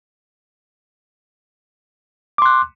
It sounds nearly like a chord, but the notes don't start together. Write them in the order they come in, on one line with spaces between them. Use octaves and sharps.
D6 C6 F#6